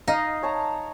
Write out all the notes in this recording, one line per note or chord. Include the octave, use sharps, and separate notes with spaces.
D#4 D#5 F5
C#5 A5 A#5